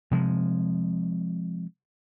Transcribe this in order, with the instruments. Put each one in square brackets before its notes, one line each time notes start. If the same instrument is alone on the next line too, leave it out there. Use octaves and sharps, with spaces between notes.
[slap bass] C3 F3 G#3